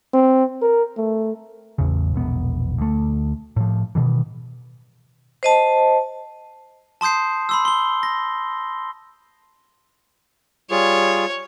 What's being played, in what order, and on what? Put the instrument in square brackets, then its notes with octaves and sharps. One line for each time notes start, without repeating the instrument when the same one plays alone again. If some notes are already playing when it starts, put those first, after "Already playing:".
[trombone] C4
A#4
A3
[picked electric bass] A1 E2 C#3
E1 A#1 B3
D2 A3
A2 F3
B2 D#3 E3
[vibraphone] C5 D#5 A5
[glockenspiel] A5 C6 D#6 G6 C7
B5 C6 E6
C6 G7
A#6
[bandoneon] G3 F4 G#4 [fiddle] C#5